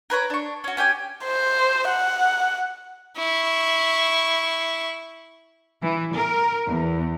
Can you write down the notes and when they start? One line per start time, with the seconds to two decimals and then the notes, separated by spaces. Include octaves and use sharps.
0.10 A#4 B4 C#5 A#5
0.30 D4 C#6
0.64 C#4 F#4
0.77 C#4 G4 G5 G#5
1.24 C5
1.88 F#5
3.17 E4 C#6
5.82 E3
6.14 A#4
6.67 E2